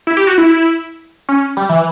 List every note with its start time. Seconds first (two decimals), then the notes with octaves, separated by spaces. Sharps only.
0.07 E4
0.17 G4
0.27 F#4
0.38 E4
1.29 C#4
1.57 G3
1.69 E3